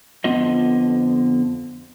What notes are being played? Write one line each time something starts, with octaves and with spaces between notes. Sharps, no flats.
F2 D3 B3 F4 D#5